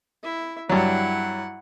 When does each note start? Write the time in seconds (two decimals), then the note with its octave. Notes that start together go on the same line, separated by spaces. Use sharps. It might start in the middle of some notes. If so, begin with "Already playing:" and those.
0.23 E4 E5
0.69 G2 F#3 E4 F#5